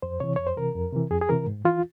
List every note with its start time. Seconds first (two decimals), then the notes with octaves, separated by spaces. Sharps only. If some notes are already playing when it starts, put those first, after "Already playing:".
0.02 F2 C5
0.20 C3 E3 C#5
0.36 F2 C#5
0.47 C5
0.56 C3 E3 A#4
0.75 F2
0.92 C3 E3
1.11 F2 G#4
1.21 G#4
1.29 C3 E3 A#4
1.47 G#2
1.65 E3 F4